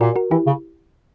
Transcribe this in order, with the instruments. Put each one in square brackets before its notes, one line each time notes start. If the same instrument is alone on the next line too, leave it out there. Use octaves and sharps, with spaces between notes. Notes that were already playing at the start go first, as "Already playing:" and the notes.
[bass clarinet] A#2 [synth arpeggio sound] F#4 A#4
[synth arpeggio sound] F#4 A#4
[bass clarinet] E3 [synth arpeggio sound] E4 G4
[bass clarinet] C#3